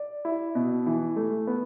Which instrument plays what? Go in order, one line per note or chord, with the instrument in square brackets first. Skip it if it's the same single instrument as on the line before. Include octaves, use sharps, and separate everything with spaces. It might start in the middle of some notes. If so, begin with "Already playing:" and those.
Already playing: [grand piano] D5
E4
B2
E3
A3
B3